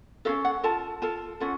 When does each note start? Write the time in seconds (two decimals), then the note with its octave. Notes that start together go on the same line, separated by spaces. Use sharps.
0.25 C#4 F#4 A4 F5
0.45 F#5
0.63 F4 A4 A5
1.02 F4 A4 A5
1.40 C#4 F4 A4 F#5